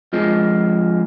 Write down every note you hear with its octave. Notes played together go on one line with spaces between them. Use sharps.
F2 F3 G#3